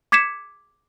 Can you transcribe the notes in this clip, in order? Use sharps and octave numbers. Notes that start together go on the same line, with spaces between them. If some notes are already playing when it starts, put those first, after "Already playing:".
D6 G#6 B6 C#7 E7